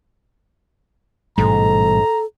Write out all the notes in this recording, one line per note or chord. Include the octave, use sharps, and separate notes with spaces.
A1 G#2 B2 G3 A4 A#5